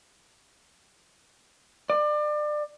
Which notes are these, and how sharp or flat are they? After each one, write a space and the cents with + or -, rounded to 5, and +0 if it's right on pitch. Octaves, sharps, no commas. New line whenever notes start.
D5 +30